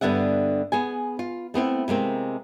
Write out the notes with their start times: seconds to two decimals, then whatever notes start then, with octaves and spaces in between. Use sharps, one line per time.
0.01 G2 D3 B3 E5 F#5
0.72 B3 G#4 G#5
1.19 F4
1.54 A3 B3 C4 E4
1.88 C3 G#3 A#3 C4